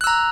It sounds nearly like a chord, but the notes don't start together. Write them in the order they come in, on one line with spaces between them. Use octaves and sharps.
F#6 E6 A#5